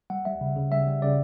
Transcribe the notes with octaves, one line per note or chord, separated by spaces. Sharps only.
G3 F#5
G3 E5
C#3
C#3
G3 E5
G3
C#3 D5